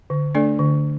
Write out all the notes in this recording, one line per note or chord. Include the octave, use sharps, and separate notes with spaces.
D3
A3 D4 A4 D5
D3